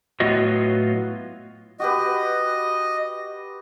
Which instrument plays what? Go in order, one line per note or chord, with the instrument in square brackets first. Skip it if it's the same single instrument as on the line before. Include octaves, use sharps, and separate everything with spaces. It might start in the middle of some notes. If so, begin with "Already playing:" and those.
[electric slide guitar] A2 F#3 B3 F4 F#4 D#5
[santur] F#4 G4 B4 [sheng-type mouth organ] D#5